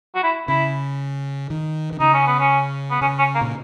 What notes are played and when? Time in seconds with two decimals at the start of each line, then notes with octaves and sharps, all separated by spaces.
0.15 F#4
0.23 E4
0.48 C#3 E4
1.50 D#3
1.92 D#3
2.00 C#3 D#4
2.14 C#4
2.27 B3
2.40 C#4
2.90 B3
3.01 C#3 C#4
3.19 C#4
3.35 A#3
3.41 A#2